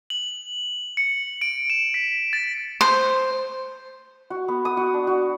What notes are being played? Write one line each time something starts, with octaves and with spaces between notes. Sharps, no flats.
F#7
C#7
D7
E7
B6
A6
C5
F#4
B3
D#6
F#4
D4
F#4